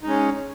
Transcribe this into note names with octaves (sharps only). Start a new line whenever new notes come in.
G#3 C#4 D#4